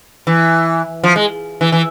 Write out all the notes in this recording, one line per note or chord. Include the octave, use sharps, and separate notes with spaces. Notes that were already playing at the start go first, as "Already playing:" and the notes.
E3
F3
G#3
E3
E3